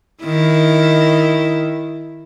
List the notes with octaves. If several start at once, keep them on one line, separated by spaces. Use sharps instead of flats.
D#3 E4